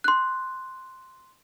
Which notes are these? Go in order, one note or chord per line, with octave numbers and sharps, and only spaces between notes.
C6 F#6